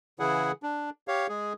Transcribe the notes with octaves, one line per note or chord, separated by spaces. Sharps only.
C#3 E3 E4 G#4 F#5
D4
G4 C#5 F5
G#3 G#4